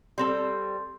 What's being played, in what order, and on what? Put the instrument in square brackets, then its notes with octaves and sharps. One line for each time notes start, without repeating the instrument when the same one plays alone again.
[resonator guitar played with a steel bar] G3 C4 A4 [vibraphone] C6